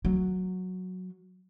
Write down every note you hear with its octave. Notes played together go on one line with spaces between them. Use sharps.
F#3